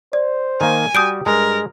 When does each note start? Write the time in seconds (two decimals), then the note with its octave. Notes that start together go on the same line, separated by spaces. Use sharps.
0.13 C5 D5
0.61 D#3 A#3 G#5
0.95 G3 F#4 G4 D#6 G6 D7
1.26 G2 G#3 A#4